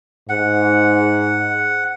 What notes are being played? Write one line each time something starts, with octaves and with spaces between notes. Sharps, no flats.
G#2 F#5